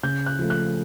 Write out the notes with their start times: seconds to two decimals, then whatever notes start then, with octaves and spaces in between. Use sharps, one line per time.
0.03 C#3 G6
0.26 F#6
0.39 F3 A3
0.50 F#6